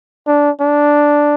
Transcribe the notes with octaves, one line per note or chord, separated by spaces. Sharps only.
D4
D4